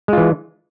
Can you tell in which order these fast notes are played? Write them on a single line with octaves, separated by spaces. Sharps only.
G#3 F4 E3